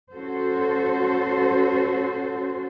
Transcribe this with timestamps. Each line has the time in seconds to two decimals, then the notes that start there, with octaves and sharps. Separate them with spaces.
0.13 C#4 F#4 A4 C5